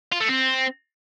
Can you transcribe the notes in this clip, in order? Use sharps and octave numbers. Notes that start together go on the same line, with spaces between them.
F4
A3
C4